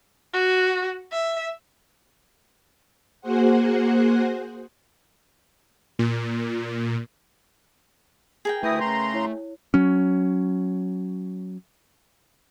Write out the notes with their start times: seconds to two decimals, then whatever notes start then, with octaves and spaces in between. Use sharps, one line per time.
0.34 F#4
1.12 E5
3.21 A#3 F#4 G#4 C5 F#5
5.99 A#2
8.45 G#4 A#4 G5
8.63 D2 A3 E4 B4 D#6 G6 A#6
8.80 C#3 A#5 C6
9.14 E4 C#5
9.74 F#3 C#4